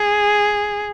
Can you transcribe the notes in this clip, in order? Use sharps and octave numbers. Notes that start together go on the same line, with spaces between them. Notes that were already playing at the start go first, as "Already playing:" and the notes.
Already playing: G#4